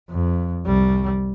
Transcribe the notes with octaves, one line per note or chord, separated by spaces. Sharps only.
F2
C2 G3